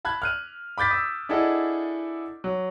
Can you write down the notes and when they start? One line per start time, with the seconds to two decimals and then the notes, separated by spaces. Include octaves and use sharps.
0.05 A5 B5 F#6 G#6
0.22 F6 F#6 D#7
0.78 B5 D6 G6 A6 B6
0.91 D#6 E6
1.29 D4 E4 G#4 A4 D#5 F#5
2.44 F#3